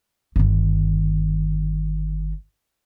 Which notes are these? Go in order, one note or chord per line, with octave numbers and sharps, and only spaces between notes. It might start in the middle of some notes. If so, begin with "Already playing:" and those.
G1 D#3